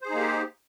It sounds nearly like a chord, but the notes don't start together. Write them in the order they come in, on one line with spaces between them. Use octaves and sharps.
C5 G#4 D#4 A#3 G4